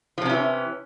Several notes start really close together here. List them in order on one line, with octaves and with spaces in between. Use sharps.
F3 C3 C#4 E3